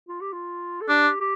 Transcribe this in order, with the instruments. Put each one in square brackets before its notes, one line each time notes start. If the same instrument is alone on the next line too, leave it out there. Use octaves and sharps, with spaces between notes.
[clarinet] F4
G4
F4
A4
[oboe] D4 [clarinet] G4
[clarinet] G4